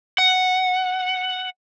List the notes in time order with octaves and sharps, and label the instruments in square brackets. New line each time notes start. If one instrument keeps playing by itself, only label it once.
[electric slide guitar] F#5